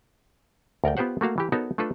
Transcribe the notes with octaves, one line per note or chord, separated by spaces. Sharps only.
D2 A#4 D5 G5
B3 F4 G4 C5 F#5
A3 A#3 F#4 F5
E3 G4
B3 D#4 F#4 A4 A#4 C#5
A3 D4 F4 A4 B4